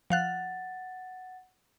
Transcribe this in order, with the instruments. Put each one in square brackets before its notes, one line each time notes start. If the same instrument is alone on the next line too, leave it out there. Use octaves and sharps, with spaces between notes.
[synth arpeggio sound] F3 F5 F#6 [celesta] F#5 A6